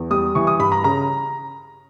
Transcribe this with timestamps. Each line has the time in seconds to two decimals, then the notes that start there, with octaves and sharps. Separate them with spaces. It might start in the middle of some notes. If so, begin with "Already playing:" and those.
Already playing: E2
0.10 G3 D#6
0.35 E3 C#6
0.47 D#6
0.59 G2 B5
0.72 A#5
0.84 C#3 A#5